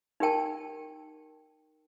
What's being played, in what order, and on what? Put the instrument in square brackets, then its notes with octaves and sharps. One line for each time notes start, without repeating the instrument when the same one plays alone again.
[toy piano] D#4 G4 A#4 G5 A5